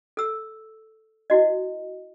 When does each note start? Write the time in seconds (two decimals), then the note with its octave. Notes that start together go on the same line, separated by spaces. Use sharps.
0.17 A4 E6
1.30 E4 F#4 D#5